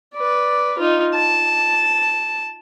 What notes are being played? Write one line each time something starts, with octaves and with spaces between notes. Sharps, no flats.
B4 D5
D#4 F4
A5